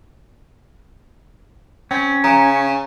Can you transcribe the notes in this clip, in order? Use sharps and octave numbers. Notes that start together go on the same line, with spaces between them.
C4 C#4
C#3 A#5